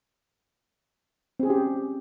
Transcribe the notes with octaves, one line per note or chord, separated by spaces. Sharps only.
C4 C#4 G4 G#4